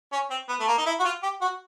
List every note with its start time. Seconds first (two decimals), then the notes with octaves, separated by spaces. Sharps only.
0.12 C#4
0.31 C4
0.49 B3
0.60 A3
0.67 A#3
0.78 D#4
0.86 E4
1.00 F#4
1.05 F4
1.23 G4
1.41 F#4